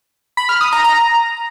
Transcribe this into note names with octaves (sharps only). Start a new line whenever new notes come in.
B5
F6
D#6
A#5
A#5